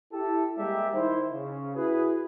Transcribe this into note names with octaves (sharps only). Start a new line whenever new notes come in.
E4 G4 A4
G3 G#3 A#3 G4 D5 E5
D#3 D#4 E4 C5
C#3
E4 F#4 G#4 B4